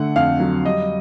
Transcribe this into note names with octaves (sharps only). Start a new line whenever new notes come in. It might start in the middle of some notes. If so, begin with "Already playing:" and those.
Already playing: D3 A3 F#5
F2 F5
F#3
G3 D#5